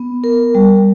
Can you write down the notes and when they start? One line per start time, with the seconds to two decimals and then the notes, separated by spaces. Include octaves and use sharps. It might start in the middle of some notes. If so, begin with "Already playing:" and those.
Already playing: B3
0.24 A#4
0.55 G3